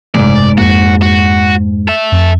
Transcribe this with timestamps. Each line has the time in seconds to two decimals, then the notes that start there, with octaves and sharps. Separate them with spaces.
0.15 F#1 E2 G#2 C3 A3 D5
0.58 F2 A#3 F#4
1.02 F#4
1.88 A4 E5
2.12 F2